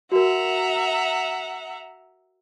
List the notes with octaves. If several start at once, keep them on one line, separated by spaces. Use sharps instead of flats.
F#4 A#4 E5 F#5 A#5